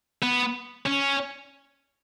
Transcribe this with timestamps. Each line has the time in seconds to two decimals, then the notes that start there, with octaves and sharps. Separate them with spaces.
0.23 B3
0.86 C#4